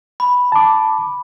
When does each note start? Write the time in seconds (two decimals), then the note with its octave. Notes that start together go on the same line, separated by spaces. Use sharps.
0.20 B5
0.52 A5 D6